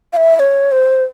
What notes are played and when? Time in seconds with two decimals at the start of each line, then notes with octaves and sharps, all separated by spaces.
0.13 F5
0.17 E5
0.36 E5
0.39 C#5
0.72 C5